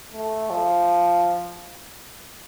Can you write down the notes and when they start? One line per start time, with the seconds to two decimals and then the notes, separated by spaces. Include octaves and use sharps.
0.12 A3
0.50 F3